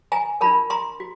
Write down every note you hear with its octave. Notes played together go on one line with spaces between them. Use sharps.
G#5 A#5
D4 F4 A#4 A5 B5
A#5 C6
F#4